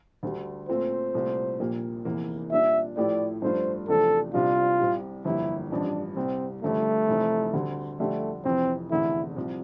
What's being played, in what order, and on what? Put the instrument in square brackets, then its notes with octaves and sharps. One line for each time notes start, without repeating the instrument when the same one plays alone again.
[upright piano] D2 D3 G3
[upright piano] A#2 A3 C4 F4 [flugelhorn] C5
[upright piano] C2 A#2 A3
A#1 A#2 G3 A#3
F1 E2 E3 A#3
[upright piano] A#2 G3 D4 [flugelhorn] E5
[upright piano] A2 F3 A3 E4 G4 [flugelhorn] D5
[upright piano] G2 F3 A3 D4 F4 [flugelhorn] C5
[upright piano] E2 C3 F3 A3 D4 [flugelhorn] A4
[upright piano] C2 C3 G3 D4 [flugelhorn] F4
[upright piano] C2 C3 G3
[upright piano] G1 F2 E3 G3 A#3 [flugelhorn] E4
[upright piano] A1 G2 F3 [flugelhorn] D4
[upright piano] C2 C3 G3 [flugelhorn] C4
[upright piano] G1 G2 F3 [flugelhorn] A3
[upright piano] F1 F2 E3
D2 D3 G3
[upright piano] F2 D3 G3 D4 G4 [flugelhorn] A3
[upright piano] F1 F2 E3 [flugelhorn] C4
[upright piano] F1 E2 D3 A3 [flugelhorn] E4
[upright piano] C2 C3 F3